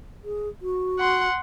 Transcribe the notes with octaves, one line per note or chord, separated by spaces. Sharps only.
G#4
F#4
F#5 C6